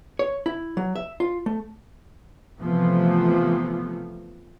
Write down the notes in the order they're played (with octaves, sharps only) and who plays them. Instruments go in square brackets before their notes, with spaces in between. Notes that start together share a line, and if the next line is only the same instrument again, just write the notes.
[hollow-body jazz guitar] C#5
E4
F#3
E5
F4
A3
[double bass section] C3 E3 F3 A3 B3